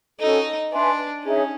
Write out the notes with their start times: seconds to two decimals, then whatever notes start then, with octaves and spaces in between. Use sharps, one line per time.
0.20 C#4 D#4 F#4 A4
0.71 D4 B4 E5 G#5 C6
1.23 C#4 D#4 G#4 C#5 E5